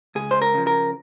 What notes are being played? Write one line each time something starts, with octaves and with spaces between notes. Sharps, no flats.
C#2 G#4
C5
A#4
C#3 F3
A#4